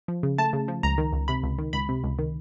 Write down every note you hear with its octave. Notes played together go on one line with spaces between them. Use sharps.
F3
C#3
A3 A5
C#3
F3
C#2 A#5
D#3
C#2
C3 B5
C#2
D#3
C#2 B5
C3
C#2
D#3